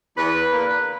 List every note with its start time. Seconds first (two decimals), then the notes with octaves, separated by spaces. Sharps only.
0.17 E2 B4
0.52 D3 A#3